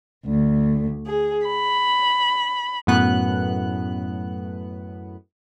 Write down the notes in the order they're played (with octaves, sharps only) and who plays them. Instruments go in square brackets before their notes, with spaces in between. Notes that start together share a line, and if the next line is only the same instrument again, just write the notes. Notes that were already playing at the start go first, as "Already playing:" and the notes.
[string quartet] D2
G#4
B5
[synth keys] F#2 A2 B3 F#6